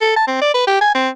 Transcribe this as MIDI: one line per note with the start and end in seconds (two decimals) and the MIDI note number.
0.01 0.15 69
0.16 0.26 81
0.27 0.37 60
0.41 0.53 74
0.54 0.63 71
0.67 0.77 67
0.81 0.91 80
0.95 1.09 60